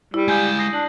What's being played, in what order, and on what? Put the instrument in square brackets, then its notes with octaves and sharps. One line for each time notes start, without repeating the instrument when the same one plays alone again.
[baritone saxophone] G3 [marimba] E4
[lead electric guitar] G#3 F5 [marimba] G#5 [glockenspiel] D#6 G6 G#6
[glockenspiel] D#6 A#6 C7
[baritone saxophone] D4 [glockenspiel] F#7